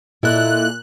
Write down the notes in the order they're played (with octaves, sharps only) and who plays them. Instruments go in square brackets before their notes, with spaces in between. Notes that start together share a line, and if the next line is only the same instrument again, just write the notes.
[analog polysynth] A#2 F#6 [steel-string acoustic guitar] E4 A4 D#5